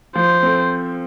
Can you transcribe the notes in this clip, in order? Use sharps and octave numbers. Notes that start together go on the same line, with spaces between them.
F3 C5
C4 A4